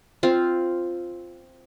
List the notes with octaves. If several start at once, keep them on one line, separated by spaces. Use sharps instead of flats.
C4 F4